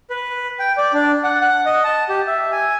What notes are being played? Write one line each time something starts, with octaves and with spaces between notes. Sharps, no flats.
B4
G5
D5
D4
F#5
F#5
D#5
A5
G4
E5
G#5